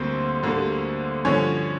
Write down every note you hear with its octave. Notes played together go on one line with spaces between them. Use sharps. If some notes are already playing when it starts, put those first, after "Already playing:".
Already playing: D2 D3 G3 A#3 C4 C5
D2 D3 G3 A#3
G2 D3 F3 C#4 C#5